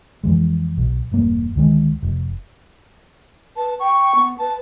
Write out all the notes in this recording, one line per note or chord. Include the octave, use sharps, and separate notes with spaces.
F2 E3 G#3
B1
E1 G2 A#3
D2 D#3 G#3
F1
B4 A5
G5 C#6
B3
B4 A5